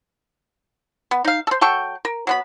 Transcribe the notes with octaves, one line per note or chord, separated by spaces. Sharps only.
B3
D#4 F5
A4 C5
F#3 A4 G5 C#6
A#4
F#3 B3 B5